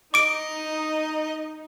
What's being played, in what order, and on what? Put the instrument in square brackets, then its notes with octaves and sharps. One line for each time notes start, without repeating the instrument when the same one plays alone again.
[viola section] D#4 [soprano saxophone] D#5 [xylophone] D6 D7